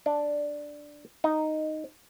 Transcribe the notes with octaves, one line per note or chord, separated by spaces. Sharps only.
D4
D#4